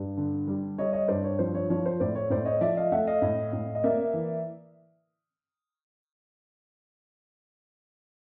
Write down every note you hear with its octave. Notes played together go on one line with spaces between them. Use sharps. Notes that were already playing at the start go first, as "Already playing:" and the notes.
Already playing: G2
D3
G3
G3 C#5 D#5
C#5 D#5
G2 C5 D5
C#5
F3 C5
C#5
F3 C#5
C5
A2 C5 D5
C#5
A2 C5 D5
C#5 D#5
F3 D5 E5
D#5 F5
A3 E5 F#5
D#5 F5
A2
A2
D#5
A#3 D5 E5
E3